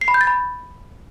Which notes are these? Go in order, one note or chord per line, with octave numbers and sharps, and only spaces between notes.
C7
B5
G6
A6
B5